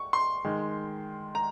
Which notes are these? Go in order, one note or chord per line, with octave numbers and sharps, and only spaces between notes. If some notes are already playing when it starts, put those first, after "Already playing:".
Already playing: C#6
C6
D#3 G#3
A#5